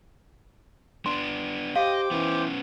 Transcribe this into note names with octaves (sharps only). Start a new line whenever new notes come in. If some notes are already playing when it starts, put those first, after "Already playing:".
B3 D4 C6
G4 C5 D#5 F5 G5 D6
E3 B3 C#4